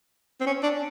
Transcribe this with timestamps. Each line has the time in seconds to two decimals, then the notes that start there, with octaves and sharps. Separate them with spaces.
0.41 C4
0.47 C#4
0.63 D4